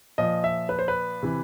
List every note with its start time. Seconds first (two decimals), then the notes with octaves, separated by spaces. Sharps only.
0.18 A#2 F3 D#5
0.44 E5
0.69 B4
0.79 C5
0.88 B4
1.23 C3 E3